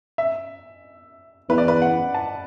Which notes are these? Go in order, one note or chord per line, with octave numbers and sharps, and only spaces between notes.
E5
E2 B4
D5
B4
F#5
A5